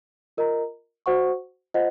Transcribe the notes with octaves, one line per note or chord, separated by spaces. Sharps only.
F4 A#4 D#5 A#5
F#4 C5 F#5 C#6
F4 C5 D#5 F#5